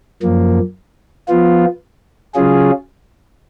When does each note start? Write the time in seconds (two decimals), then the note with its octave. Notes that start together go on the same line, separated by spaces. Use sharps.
0.22 F#2 F3 A#3
1.28 F3 B3 F4
2.34 C#3 F#3 C#4 F4 G#4